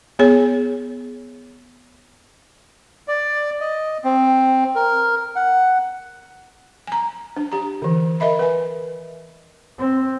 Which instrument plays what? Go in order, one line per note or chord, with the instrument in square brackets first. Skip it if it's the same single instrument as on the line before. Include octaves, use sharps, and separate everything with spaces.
[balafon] B3 G#4 C#5
[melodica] D5
D#5
C4
A#4
F#5
[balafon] G#5 A#5
D4
G4 A#5
D3 E3
A#4 D#5 E5 B5
B4 G#5
[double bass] C4